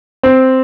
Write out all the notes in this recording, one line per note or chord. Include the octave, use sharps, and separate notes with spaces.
C4